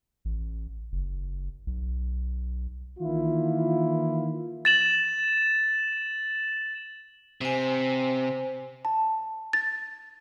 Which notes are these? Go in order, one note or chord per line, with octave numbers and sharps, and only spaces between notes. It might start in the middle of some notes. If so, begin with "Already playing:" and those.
A1
F#1
B1
D#3 E3 A#3 E4 F4
A6 E7 F#7
C3 C5 G#5
A5
A6